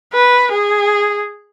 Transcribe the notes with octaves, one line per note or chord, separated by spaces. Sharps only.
B4
G#4